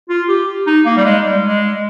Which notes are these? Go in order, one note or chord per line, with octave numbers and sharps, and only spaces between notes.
F4
G4
D#4
A#3
G3
G#3
G3
G#3